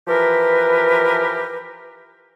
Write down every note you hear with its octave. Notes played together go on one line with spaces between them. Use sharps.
E3 F3 G4 A#4 B4